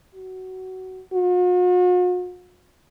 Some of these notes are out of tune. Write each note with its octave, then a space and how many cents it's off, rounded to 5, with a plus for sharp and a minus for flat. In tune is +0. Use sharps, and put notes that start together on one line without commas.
F#4 +15
F#4 -45